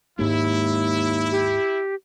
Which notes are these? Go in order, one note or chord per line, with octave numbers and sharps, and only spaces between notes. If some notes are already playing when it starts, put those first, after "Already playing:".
D#2 G#2 G#3 E4
G4